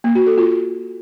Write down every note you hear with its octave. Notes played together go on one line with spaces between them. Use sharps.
A#3
F#4
A4
F4